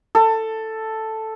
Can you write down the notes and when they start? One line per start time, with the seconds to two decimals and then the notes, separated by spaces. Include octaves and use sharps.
0.15 A4